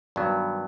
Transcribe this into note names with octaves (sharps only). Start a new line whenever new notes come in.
G2 D#3 F#3 B3